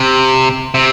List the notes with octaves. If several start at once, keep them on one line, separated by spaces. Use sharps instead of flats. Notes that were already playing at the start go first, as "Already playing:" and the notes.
Already playing: C3
C3